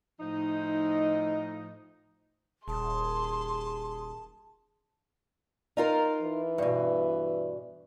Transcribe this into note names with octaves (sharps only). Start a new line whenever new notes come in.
A2 F3 D#4
D#1 G#4 A5 C6
D#4 F4 A#4
E3
G2 B2